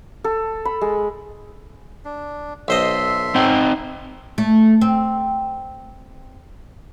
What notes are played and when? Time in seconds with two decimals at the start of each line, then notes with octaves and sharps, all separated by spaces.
0.24 A4
0.65 B5
0.81 G#3
2.05 D4
2.68 B1 A4 C5 D#5 E5 C6
3.35 C4 D#4 G5
4.38 A3
4.81 C4